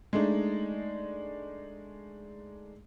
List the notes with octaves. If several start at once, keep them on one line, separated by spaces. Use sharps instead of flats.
G#3 A3 D4 D#4